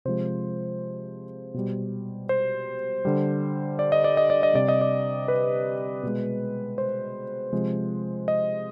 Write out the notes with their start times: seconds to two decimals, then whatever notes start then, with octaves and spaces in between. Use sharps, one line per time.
0.05 C3 F3 G#3 C5
1.54 B2 G3
2.29 C5
3.05 D3 G3
3.79 D5
3.92 D#5
4.04 D5
4.17 D#5
4.30 D5
4.43 D#5
4.53 C3 G3 D5
4.68 D#5
4.81 D5
5.28 B4
6.03 B2 G#3
6.78 C5
7.53 C3 F3 G#3
8.28 D#5